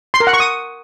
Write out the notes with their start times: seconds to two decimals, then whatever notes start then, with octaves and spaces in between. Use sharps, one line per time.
0.14 C6
0.20 A#4
0.27 F#5
0.33 C#6
0.40 D#6